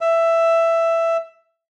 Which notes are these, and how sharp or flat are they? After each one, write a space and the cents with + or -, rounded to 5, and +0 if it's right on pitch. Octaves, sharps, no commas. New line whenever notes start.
E5 +10